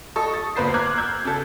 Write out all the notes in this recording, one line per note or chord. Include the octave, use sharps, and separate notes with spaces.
A4 D#5 C#6 D#6
A6
D2 A#3 B3 B4 C5 C7
A#5 D6 F6 F#6 G#6
E6 G6 G#6
C#3 A4